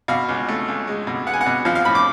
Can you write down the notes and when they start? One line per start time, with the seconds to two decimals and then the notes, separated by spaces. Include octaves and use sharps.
0.08 B2 F5
0.29 C#2
0.48 A3
0.68 C#2
0.87 G#3
1.07 B2
1.27 B3 F#5
1.34 G#5
1.41 F#5
1.46 B2
1.65 F3 F5
1.75 F5
1.85 A2 B5
1.95 D6